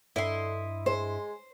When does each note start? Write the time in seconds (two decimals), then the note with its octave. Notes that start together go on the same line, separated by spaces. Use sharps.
0.16 G2 D3 E4 D#5 C6
0.86 G#3 C5